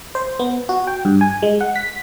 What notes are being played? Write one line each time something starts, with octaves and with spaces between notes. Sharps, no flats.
C5
B3
F#4
G5
G2
G#5
G#3
F#5
B6